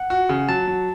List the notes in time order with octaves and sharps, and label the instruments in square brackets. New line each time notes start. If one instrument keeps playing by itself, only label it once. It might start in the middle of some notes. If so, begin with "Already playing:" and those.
Already playing: [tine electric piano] F#5
[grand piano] F#4
C#3
[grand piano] F#3 [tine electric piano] A5
[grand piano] F#3